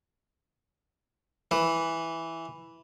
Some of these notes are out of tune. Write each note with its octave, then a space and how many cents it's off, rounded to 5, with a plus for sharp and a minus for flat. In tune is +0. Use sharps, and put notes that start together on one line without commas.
E3 +0 B4 +0